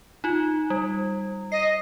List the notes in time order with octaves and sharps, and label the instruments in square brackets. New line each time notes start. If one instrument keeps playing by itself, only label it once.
[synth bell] D#4 F4
G3
[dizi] D#5 [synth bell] C7